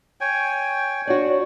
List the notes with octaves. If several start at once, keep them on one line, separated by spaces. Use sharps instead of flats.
C#5 G5 G#5
D4 F#4 C#5